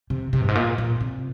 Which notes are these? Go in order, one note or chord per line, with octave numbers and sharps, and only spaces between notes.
C3
C3
G2
G#2
A#2
A#2
C3